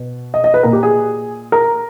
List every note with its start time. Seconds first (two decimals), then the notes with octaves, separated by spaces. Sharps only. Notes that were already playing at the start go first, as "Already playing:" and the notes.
Already playing: B2
0.34 D#5
0.44 D#5
0.54 B4
0.63 A#2 A#4
0.73 G4
0.83 G#4
1.52 A#4